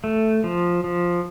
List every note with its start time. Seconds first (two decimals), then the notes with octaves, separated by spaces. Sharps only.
0.04 A3
0.44 F3
0.84 F3